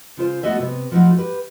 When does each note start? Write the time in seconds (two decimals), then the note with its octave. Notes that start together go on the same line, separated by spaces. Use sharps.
0.17 C#3 F4 C5
0.43 A3 B3 C4 F#4 D#5 E5
0.59 C3 B3
0.91 F3 F#3 A3 D#4 E4 F#4
1.17 G4 B4